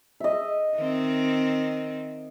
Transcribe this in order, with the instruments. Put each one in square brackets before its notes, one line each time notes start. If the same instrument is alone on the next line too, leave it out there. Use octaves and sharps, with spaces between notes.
[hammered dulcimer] D#5 E5
[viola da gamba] D#3 C4